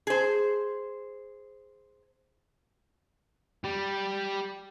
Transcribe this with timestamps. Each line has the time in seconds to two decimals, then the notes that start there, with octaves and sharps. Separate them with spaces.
0.07 G#4 C5
3.64 G3